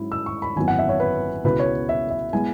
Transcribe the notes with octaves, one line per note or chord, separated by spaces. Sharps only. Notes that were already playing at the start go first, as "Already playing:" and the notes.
Already playing: G#2 F#3 C#4 E4
E6
C#6
B5
G#1 F#2 F#3 B3 E4 G#5
F#5
E5
C#5
B4
C#2 B2 B3 E4 B4
C#5
E5
E5
G#3 B3 E4 G#5